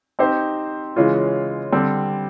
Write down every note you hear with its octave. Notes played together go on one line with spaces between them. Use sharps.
C4 D#4 G4 C5
C#3 E3 G#3 C#4 F4
D3 G3 C4